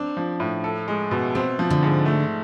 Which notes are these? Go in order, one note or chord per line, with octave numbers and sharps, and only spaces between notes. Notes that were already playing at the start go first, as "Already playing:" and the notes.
Already playing: C4 D4
F3
A2
A4
G#3
B2
B3 C4
F3
D3
G#2
A3